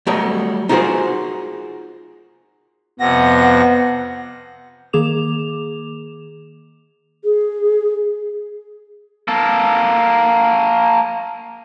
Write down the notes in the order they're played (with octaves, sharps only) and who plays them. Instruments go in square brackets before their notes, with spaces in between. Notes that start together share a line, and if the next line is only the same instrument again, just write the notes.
[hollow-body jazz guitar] F#3 G3 A3 A#4 C#5 D#5
D#4 F4 F#4 G#4 A#4 C5
[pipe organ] F2 C3 A#6 [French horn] B3 [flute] F#5
[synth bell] D#3 A#3 G#4 D6 E7 F7
[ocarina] G#4
[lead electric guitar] A#3 A4